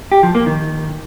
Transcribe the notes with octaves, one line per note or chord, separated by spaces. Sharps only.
G4
F3
A#3
D#3